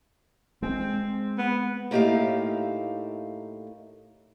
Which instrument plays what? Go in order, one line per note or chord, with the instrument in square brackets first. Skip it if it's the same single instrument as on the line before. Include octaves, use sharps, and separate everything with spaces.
[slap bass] G#3 [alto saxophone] C4
[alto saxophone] B3
[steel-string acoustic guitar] A2 A#3 D#4 G4 E5 F5